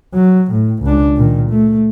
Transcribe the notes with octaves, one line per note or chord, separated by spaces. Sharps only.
F#3
A2
C#2 D4
A#2 D#3
A3